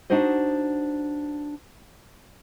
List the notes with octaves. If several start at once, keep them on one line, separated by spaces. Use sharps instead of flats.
D4 D#4 F#4 C5 D#5